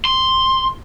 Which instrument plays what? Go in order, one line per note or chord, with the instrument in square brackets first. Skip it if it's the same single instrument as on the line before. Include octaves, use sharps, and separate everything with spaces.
[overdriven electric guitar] C6